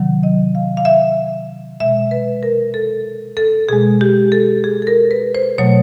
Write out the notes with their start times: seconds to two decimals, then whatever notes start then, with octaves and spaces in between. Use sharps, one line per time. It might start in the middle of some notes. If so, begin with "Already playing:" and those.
Already playing: C3 D#3 F#3
0.23 D#5
0.55 F5
0.77 F5
0.85 E5
1.80 B2 G#3 E5
2.11 B4
2.43 A#4
2.74 A4
3.37 A4
3.69 B2 G#3 G#4
4.01 G4
4.32 A4
4.64 G#4
4.82 A4
4.87 A#4
5.11 B4
5.35 C5
5.58 B2 F#3 A3 C#5